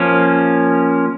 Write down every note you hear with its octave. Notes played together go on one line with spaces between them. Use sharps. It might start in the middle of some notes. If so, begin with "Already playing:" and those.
Already playing: F3 A#3 C#4